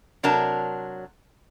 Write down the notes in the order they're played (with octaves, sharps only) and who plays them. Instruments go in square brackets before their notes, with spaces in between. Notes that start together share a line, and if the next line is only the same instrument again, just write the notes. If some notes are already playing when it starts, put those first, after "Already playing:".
[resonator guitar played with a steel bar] C3 F#3 D4 A#4 A5